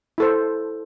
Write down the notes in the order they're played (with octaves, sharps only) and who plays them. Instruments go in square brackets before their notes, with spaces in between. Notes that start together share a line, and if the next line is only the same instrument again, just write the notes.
[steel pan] E4 A4 C5